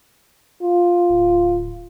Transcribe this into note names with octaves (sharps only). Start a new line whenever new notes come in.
F4
D1